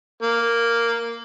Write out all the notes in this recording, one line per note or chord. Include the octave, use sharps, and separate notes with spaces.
A#3